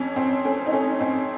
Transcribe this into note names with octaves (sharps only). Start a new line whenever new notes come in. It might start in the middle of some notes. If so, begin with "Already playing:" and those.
Already playing: F2 C#4
F2 C4
A3 C#4
D#4
A3 C#4
F2 C4